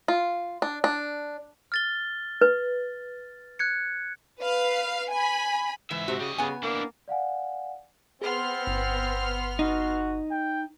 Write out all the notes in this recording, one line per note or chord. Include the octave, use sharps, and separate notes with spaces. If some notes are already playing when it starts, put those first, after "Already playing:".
F4
D4
D4
F6 A6 G7
B4
F#6 G#6 C#7
B4 F5
G#5 B5
G#2 E3 E5
C3 F#4
C#3 G3 D#5
C#3 B3 G#5
A#3 D4 E4
D5 F5 F#5 G#5
B3 C4 G#4 C6 F6
G1
D#4 F#4
G5